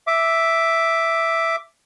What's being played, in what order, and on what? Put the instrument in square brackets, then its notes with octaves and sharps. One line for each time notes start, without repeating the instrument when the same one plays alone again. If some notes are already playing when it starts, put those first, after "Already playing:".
[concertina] E5 D6